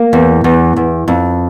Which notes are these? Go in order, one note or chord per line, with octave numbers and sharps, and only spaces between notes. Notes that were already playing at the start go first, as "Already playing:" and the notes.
Already playing: A#3
E2
E2
E2
F2